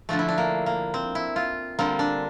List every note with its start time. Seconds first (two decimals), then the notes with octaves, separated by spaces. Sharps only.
0.09 D3 F3 A3 D4
0.19 E4
0.29 D4
0.38 A#3
0.66 A#3
0.94 C4
1.15 E4
1.36 F4
1.79 D3 G3 A#3 C4
1.99 D4